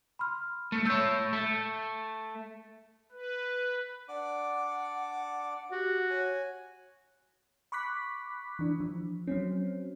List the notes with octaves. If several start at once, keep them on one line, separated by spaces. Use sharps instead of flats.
B5 C6 F6
A3
A3 C#5 E6 G6 C7
A3
B4
D4 D5 F#5 D6
F#4 G4
C#5 G#5
B5 C#6 D6 F#6 B6
E3 D4
F3
F#3 C4 C#4